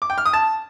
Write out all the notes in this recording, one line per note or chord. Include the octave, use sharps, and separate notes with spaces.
D6
G5
F6
D#6
A5